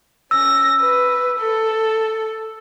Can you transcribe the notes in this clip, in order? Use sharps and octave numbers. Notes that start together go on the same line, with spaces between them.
C#4 E6 A#6
B4
A4